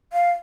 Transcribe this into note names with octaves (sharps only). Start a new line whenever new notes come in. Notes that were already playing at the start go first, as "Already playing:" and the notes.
F5